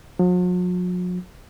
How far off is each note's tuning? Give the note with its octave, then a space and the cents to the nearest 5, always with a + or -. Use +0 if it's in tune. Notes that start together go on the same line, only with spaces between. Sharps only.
F#3 -45